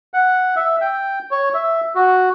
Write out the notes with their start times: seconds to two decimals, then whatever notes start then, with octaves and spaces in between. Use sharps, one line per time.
0.14 F#5
0.56 E5
0.81 G5
1.31 C#5
1.54 E5
1.95 F#4